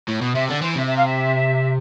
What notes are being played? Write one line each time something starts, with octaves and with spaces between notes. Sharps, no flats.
A2
B2
C3 E5
D3 D5
E3 C5
C3 E5
E5
F5
E5